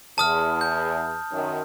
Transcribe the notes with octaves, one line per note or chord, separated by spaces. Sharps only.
E2 A5 D#6 F6
G6
F#2 D#3